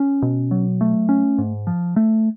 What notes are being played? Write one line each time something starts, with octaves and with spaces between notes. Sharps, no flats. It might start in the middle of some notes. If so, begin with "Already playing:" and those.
Already playing: C#4
B2
F#3
A3
C#4
G#2
F3
A3